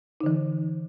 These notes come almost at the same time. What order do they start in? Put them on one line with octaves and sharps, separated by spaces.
D#4 D3 E3